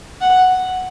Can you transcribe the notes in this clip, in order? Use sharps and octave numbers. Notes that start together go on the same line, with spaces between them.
F#5